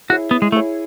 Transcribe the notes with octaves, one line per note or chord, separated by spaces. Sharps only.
E4 F#4 G#4 C#5
B3
G#3
A3 E4 G#4 C#5